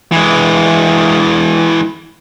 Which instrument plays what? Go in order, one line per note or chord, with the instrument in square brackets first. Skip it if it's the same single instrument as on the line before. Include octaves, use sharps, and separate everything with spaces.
[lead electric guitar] E3 G#3